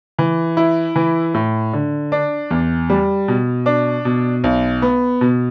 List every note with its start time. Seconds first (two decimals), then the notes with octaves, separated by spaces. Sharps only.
0.19 E3
0.57 E4
0.96 E3
1.34 A2
1.73 D3
2.12 D4
2.51 E2
2.90 G3
3.28 B2
3.66 D4
4.05 B2
4.44 B1
4.82 B3
5.21 B2